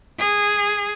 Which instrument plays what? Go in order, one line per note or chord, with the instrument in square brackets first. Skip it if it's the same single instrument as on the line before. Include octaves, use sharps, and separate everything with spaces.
[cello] G#4